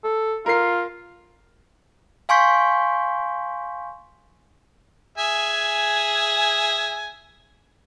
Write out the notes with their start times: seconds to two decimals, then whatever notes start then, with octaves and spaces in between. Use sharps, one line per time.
0.04 A4
0.46 F4 A#4 C7
2.29 F5 G#5 C6 C#6 G6 B6
5.18 G#4 E5 G#5